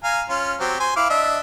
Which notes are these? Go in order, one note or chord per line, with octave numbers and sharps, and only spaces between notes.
F5 G#5 A#5
C#4 F4
F#3 C4 G4
C5 G#5 C6
E4 F5 D6
D4 D#5 E5